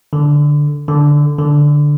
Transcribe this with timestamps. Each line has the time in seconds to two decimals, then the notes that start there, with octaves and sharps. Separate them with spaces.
0.13 D3
0.88 D3
1.38 D3